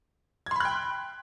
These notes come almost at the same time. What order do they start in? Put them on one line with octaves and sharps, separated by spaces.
G#6 C6 B5 F#6 G5